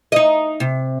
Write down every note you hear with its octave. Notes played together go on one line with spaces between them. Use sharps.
D#4 D#5
C3